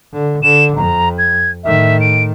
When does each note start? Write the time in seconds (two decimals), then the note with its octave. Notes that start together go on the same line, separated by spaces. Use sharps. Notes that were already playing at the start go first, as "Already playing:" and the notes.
0.13 D3
0.43 D3 E7
0.77 F2 A#5
1.18 G#6
1.64 A2 D#3 E5
2.01 D7